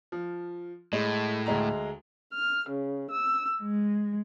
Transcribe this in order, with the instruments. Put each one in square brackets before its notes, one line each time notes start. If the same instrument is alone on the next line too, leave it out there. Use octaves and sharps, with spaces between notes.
[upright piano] F3
[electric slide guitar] A2 [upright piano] G#3
[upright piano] D2 G#3 A#5
[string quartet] F6
C#3
E6
G#3